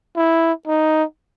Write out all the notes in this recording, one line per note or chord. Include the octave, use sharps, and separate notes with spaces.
E4
D#4